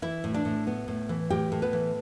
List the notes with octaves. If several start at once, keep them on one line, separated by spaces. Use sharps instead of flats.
E3 E4 E5
A2
D4 D5
A2
B3
A2
E3
A2 G4 G5
A2
B3 B4
E3